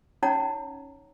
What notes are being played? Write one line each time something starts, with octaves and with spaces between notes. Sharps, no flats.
C#4 D#4 C#5 F#5 A#5